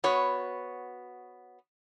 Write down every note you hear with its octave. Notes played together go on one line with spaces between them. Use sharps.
B3 F#4 C#5